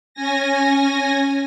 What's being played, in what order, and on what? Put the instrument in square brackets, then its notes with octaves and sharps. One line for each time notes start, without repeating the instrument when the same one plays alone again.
[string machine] C#4 G#5 A#6